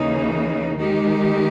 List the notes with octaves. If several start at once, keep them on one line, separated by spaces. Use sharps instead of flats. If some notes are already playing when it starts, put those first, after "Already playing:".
Already playing: D#2 C#3 E3 A#3 D#4
D#3 G#3 D#4 G4